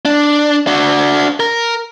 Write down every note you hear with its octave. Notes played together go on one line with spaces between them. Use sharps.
D4
D4 F#4
A#4